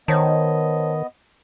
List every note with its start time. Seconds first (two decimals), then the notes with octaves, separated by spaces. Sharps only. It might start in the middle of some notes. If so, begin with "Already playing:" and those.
0.08 D#3 B3 C5 C#5 D#5 A5